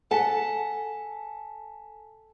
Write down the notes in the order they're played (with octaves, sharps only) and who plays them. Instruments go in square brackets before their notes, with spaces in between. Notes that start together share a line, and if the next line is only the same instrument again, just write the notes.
[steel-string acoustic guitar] A4 F#5 A5 [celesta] G#5 B6